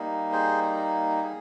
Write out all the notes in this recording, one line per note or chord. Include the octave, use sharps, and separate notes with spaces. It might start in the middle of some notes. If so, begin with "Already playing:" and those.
Already playing: G3 A#3 D#4
G#4 C5
G#4